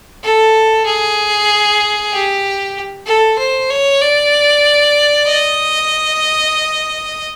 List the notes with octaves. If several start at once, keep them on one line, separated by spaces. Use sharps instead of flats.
A4
G#4
G4
A4
C5
C#5
D5
D#5